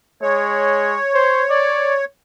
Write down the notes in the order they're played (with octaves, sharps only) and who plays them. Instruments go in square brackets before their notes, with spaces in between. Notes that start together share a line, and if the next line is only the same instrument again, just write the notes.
[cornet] G#3 [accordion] C#5
[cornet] C5
D5